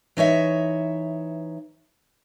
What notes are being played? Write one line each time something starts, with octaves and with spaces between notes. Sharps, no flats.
E3 D#4 C#5 E5